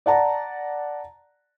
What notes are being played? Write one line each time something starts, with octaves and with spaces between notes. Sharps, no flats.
D5 F#5 A5 A#5